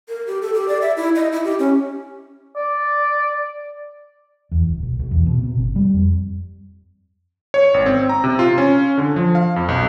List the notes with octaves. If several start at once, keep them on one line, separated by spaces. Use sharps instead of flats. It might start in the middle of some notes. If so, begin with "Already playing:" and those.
A#4
G4
A4
G4
D5
E5
E4
D#5
E4
G4
C#4
D5
E2
D1
B1
B1
E2
B2
C3
G1
G3
F2
C#5
G#1
C4
A#5
C3
F4
C#4
D3
F3
F5
F2
B1